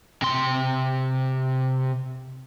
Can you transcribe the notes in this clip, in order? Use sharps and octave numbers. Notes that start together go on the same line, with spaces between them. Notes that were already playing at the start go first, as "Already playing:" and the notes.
C3 C6